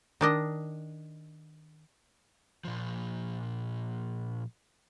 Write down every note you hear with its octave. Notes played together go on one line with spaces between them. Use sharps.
D#3 D4 D#5
A#2 F3